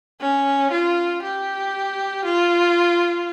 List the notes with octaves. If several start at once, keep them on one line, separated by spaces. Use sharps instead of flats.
C#4
F4
G4
F4